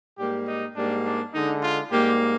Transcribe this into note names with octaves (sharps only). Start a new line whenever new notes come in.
G#2 G3 A#3 G4
D#4
G#2 G3 A#3 D4
D4
D3 G#3 D#4
F4
G#2 G3 A#3 G4